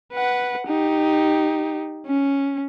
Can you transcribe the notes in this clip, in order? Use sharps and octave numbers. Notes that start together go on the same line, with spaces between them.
B4 F#5
D#4 G4
C#4